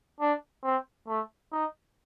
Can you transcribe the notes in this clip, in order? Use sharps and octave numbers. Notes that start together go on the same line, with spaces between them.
D4
C4
A3
D#4